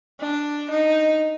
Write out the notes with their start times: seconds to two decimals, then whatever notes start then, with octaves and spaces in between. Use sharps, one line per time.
0.20 D4
0.71 D#4